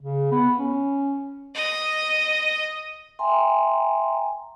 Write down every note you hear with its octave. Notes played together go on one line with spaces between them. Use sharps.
C#3
B3
C#4
D#5
E5 G5 G#5 A#5 C6